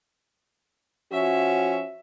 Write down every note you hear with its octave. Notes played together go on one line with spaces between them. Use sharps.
F3 C#4 F#4 E5